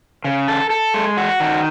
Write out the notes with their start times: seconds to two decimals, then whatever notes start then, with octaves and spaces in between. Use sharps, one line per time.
0.25 C#3
0.48 A4
0.70 A4
0.94 G#3
1.17 F#4
1.40 D#3